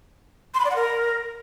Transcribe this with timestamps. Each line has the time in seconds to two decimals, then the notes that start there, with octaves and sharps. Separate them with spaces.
0.54 C6
0.60 B5
0.65 D5
0.70 F#5
0.76 A#4